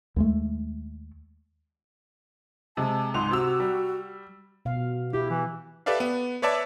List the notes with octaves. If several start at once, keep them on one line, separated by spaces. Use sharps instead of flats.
D#2 G#3 A3
C3 G#3 A5
C#2 G#2 C6 F7
C3 F#4 E6
G3
B2 F5
E4 G4
E3
G4 A4 B4 D5 E5 F5
B3
B4 C#5 D5 E5 A5 D6